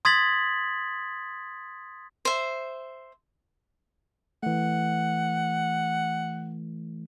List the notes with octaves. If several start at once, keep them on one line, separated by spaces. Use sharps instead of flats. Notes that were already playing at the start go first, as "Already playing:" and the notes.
C6 D#6 G#6 A6 B6 F#7
C5 E5
E3 A3 F#5